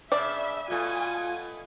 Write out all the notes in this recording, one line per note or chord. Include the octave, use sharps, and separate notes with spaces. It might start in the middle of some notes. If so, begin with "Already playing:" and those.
C#3 D4 D5 E5
B2 A3 F4 G#5